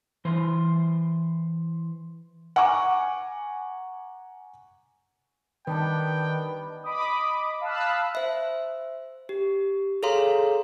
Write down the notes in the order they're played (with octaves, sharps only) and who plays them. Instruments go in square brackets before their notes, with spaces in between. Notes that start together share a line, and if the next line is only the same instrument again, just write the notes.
[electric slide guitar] E3 C5
[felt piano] F#5 G#5 A#5 C#6 D6
[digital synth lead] D#3 [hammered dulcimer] G3 D4 D#4 [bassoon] B3 [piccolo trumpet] G5
[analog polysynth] D#5 B5 D6 D#6
F5 A5 B5 D#6 E6 F#6
[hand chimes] C5 E5
G4
G#4 A4 C#5 F5 A#5 C6